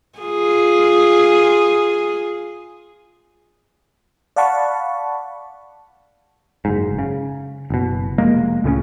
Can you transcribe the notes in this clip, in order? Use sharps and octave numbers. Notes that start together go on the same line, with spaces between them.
F4 G#4
D5 F5 F#5 A5 B5 C#6
F#1 G#2
C#3
F#1 B2
F1 G#3 A#3
C#2 A2 C#3 C#4